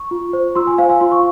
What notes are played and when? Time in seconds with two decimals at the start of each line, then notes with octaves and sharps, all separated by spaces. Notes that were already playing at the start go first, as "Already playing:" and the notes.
Already playing: C#6
0.11 F4
0.33 C5
0.55 F4 C6 E6
0.67 G#5 C6
0.78 C5 F5 G#5
0.90 F5 G#5
1.01 F4 C6
1.12 C#6